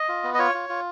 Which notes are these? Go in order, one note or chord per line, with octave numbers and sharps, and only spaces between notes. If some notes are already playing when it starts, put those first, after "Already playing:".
Already playing: D#5
F4
B3
D#5
F4 C#5
F4
F4